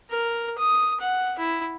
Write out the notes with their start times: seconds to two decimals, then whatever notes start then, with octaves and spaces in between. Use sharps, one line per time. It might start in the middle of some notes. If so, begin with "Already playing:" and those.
0.11 A#4
0.58 D#6
1.00 F#5
1.39 E4